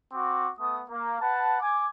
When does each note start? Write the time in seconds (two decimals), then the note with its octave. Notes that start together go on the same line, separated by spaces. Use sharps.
0.13 C4 F#4 D6
0.58 A3 B3 D#6
0.89 A#3
1.21 B4 F#5 A5
1.61 G#5 D6